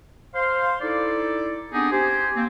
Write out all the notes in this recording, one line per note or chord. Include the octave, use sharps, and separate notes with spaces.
C5 F5 C6
D#4 E4 A4 D5
B3 C4 D4 D#4 G4 G#4
G4 C5 G#5
A#3 C4